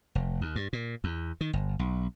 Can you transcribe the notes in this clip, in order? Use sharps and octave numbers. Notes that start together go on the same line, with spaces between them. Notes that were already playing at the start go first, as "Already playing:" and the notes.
F1
D#2
G2
A#2
E2
D#3
G1
B1